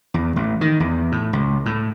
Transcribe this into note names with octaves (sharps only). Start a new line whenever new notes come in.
E2
A1
D#3
E2
A2
C#2
A2